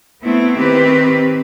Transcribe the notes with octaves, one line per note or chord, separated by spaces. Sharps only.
A3 B3 C4 E4
D#3 C4 G4 B4